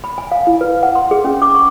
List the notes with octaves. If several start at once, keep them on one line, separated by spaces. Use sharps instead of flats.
B5
G#5
F5
E4
B4
F#5
C6
G#4
C#4
D6
C#6